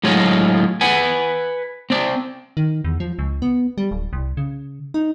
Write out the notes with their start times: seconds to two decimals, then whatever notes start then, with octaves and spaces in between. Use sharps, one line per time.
0.04 A2 F#3 G#3 F4 C#5 D#5
0.81 B4 F#5 G#5
1.90 C4 D5
2.57 D#3
2.84 E2
3.00 F3
3.19 C#2
3.42 B3
3.78 G3
3.91 D1
4.13 C2
4.37 C#3
4.94 D#4